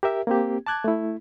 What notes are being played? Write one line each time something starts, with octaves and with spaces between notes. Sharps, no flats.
G4 A#4 E5
A#3 C4 G4
A5 D6 F#6 G#6
A3 E4